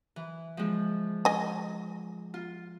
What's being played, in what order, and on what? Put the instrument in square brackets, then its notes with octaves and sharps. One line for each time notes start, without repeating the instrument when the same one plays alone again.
[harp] E3
F3 G#3
[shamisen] D#5 G#5
[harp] F4